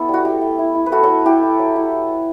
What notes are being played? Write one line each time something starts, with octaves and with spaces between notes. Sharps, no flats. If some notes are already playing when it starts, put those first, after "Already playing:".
Already playing: B3 E4 A4
G3 F#4
A3 G4
A3
E4
E4
B4
A3 F#4 A4
A4 C#5
A3
E4 G4
E4
F#3
E4